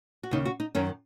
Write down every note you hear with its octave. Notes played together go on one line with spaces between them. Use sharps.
F#4
D#2 C#3 D#4
F#4
D#4
F#2 D#3 C#4